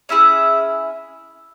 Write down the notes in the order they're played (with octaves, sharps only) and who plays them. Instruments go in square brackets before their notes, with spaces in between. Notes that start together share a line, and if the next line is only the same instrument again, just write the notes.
[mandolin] C#4 E4 G#4 E5